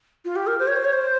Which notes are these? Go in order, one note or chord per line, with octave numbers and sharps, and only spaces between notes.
F4
G4
A#4
C5
C#5
C5
C#5
C5